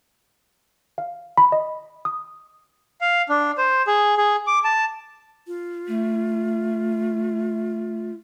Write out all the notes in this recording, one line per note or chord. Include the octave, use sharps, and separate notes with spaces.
F5
B5
D#5
D#6
F5
D4
C5
G#4
G#4
D6
A5
F4
A3